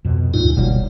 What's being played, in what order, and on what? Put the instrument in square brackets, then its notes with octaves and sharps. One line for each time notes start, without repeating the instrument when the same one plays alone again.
[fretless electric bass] F2 B2
[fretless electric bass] D2 G2 A#2 [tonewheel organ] D#4 F4
[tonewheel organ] F#1 [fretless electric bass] B2 G3 A#3